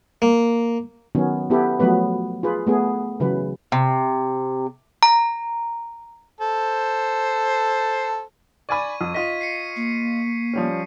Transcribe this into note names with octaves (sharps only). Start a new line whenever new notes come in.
A#3
D#3 F#3 B3 C#4
B3 E4 G4 A4 B4
F3 F#3 A3 B3 B4
F4 G#4 B4
A3 B3 G#4
C#3 E3 F#3 B4
C3
A#5
A4 C5
D5 G#5 B5 C#6 G#6 D#7
F2
F4 D#5 B6 D#7
C7 C#7
A#3
F3 G3 C#4